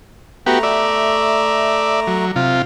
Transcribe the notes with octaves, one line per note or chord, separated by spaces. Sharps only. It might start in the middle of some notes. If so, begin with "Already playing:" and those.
A3 B3 F#4 G4 A#5
D5 E5
F#3
C3 F4